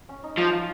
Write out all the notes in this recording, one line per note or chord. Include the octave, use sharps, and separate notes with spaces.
C#4
D#4
F3 D#4
F4